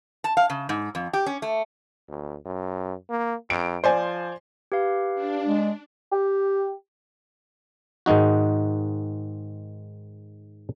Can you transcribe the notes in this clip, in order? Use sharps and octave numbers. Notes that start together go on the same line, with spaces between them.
A5
F5
C#3
G#2
F2
G4
C#4
A3
D2
F#2
A#3
F2 D7
F3 C5 D5 G#5
G4 B4 F5
D4
G#3
G4
G#2 D#3 G#3 D#4 F#4